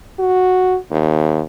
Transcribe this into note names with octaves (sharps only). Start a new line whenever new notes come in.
F#4
D#2